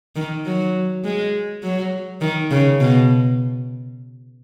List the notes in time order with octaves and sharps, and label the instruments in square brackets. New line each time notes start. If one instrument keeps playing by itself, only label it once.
[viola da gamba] D#3
F#3
G#3
F#3
D#3
C#3
B2